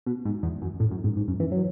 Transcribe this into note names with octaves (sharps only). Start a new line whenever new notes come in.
B2
G#2
E2
F#2
A2
F#2
G#2
G#2
F#2
E3
F#3